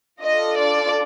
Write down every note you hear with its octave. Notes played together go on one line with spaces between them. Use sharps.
D4 F4 A4 D#5
D5